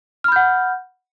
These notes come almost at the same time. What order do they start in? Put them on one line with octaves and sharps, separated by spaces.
F6 B5 G6 F#5